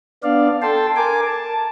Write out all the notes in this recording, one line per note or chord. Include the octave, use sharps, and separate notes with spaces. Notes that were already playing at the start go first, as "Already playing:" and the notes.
B3 D4 D5 F5
A4 G5 A5 C6
A#4 G#5 D6
A5